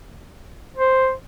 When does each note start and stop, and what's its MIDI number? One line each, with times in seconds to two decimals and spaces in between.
0.77 1.12 72